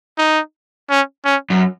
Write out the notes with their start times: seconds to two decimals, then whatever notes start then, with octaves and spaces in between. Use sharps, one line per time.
0.18 D#4
0.90 C#4
1.25 C#4
1.50 F#2